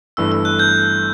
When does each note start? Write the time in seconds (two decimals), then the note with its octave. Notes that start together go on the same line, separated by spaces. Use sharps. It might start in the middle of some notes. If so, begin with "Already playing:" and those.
0.17 G1 G2 E3 A3 E6
0.32 E6
0.45 F#6
0.59 G6